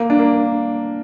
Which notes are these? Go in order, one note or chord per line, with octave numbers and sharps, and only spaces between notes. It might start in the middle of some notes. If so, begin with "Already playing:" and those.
Already playing: A#3
D4
A#3